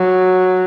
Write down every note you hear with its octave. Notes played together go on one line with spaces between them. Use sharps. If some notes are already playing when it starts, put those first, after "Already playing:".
Already playing: F#3